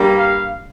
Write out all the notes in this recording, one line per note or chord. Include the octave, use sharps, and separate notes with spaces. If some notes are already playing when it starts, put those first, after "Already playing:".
Already playing: G2 G3 A#3
F5